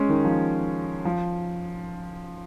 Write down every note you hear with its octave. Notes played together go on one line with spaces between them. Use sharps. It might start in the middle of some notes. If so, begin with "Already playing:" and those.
Already playing: G#3 C#4
D#3
F3
F3